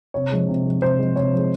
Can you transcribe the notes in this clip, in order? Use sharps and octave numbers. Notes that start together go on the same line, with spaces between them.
C3 C#5
F3 G#3
C3
F3 G#3
C3 C5
F3 G#3
C3 C#5
F3 G#3